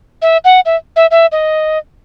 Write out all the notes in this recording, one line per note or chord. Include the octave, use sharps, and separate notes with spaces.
E5
F#5
E5
E5
E5
D#5